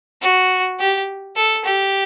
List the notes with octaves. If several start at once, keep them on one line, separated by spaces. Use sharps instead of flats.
F#4
G4
A4
G4